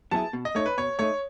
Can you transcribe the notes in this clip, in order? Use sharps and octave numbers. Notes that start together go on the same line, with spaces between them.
F#3 B3 E4 G#4 A5
B2
D#5
A3 D#4 C#5
B4
B2 C#5
A3 D#4 C#5